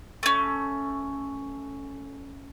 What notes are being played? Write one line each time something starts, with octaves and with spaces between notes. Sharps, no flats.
A3 C#4